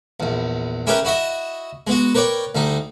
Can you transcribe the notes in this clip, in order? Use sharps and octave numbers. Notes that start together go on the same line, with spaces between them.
A#1 E2
C#4 E4 G4 G#4 A#4 B4
E4 F#4 D#5 E5
G#3 B3 F#4
A#4 B4 C#5 D5 G5
D2 G3 D#4